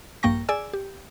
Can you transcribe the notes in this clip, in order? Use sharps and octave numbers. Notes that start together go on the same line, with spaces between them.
A#1 G2 A#3 G5 C#6 A#6
G#4 D5 G#5 E6
G4